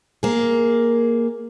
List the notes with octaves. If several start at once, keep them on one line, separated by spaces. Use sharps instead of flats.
A#3 G#4